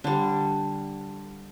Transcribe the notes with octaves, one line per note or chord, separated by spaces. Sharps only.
D3 G3